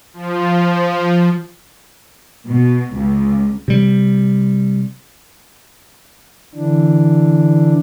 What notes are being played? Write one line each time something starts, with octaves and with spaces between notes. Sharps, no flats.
F3
B2
C#2
C3 G3
D3 E3 D4